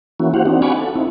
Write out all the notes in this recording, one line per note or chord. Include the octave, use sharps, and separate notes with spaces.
E3 A#3 C#4 E4 F#4
F#4 G4 C5 F5 F#5
C4 D4 D#4 F#4
F5 F#5 G#5 B5 C#6 D6
A4
C4 D#4 E4